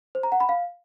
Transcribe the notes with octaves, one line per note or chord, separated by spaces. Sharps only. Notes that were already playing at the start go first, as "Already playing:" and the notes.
C5
A#5
F#5
B5
F5